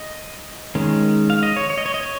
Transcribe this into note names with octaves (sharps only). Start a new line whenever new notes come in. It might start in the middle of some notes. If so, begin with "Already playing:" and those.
Already playing: D#5
D#3 G#3 C#4
F5
D#5
C#5
C#5
D#5
C#5
D#5
C#5